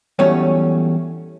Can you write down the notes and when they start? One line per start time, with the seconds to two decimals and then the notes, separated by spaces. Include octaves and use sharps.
0.19 E2 A2 F#3 G3 A3 C#4